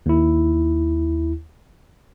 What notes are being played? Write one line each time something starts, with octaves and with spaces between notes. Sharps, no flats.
D#2 E4